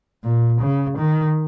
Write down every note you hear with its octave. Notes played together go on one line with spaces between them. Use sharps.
A#2
C#3
D#3